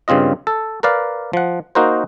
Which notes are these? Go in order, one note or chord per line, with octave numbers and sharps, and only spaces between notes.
G2 C#3 C4 F4 D#5
A4
A#4 B4 D5 F5
F3 F#5
A#3 D#4 F#4 A#4 C5